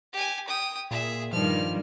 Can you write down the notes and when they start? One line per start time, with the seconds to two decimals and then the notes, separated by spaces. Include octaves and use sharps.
0.13 G4 G#5
0.48 G5 D#6
0.91 A#2 G#4 E5
1.33 G2 D#3 F3 G3 F6